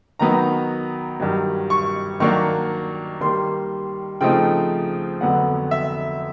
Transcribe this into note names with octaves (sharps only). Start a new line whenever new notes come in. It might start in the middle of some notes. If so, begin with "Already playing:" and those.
D#3 F#3 B3 D#4 A#5
G2 D#3 F#3
C#6
D#3 F#3 A#3 D4 C#6
D#3 G3 A#3 C6
C#3 F3 A3 C4 D#4 G5
F2 D3 F#3 B3 F#5
E5